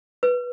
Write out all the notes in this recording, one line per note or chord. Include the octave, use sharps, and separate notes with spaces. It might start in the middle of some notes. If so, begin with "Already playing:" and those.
B4